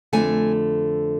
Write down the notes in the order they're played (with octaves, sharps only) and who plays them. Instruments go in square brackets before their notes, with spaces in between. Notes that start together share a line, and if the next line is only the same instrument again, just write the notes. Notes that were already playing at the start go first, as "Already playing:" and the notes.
[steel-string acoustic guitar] F2 D3 A3 G#5